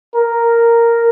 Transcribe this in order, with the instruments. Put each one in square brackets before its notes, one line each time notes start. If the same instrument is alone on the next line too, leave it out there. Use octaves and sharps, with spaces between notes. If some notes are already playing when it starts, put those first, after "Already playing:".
[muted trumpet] A#4